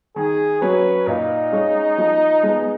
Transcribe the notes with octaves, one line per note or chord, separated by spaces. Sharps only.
D#3 G#4
F#3 C#4 B4
A#2 D#4
G#3 C#4
F3
G#3 B3